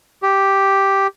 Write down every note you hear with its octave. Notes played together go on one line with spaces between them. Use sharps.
G4